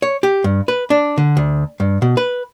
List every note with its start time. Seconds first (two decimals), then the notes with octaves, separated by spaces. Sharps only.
0.02 C#5
0.23 G4
0.44 G2
0.68 B4
0.90 D4
1.18 D3
1.37 D2
1.80 G2
2.02 B2
2.17 B4